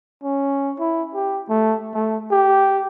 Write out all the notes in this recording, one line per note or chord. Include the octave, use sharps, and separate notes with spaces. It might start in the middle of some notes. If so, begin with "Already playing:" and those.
C#4
E4
G4
A3
A3
G4